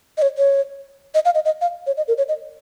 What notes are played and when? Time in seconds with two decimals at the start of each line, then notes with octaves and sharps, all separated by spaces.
0.18 D#5
0.22 C#5
0.38 C#5
1.15 D#5
1.25 F5
1.35 D#5
1.45 D#5
1.61 F5
1.87 C#5
1.97 D#5
2.08 A#4
2.18 C#5
2.28 D#5